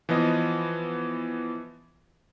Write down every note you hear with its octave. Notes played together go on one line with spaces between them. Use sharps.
E3 F3 B3 D#5